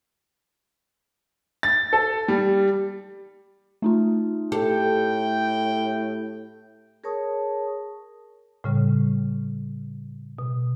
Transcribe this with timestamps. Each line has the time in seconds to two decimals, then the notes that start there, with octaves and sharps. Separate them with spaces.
1.63 A6
1.93 A4
2.28 G3
3.82 A3 D#4 F4
4.52 A2 G4 A4 G5
7.04 G#4 A#4 C#5 A5 C#6 D#6
8.64 A2 C#3 G3
10.39 B2